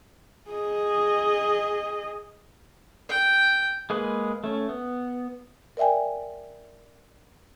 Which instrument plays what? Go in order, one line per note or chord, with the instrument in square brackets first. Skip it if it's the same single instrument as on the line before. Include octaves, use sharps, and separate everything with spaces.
[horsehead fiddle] G#4 D#5
[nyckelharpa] G5
[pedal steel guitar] G#3 A#3 G#4 B4
A3 C#4
B3
[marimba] A#4 D5 E5 G5 G#5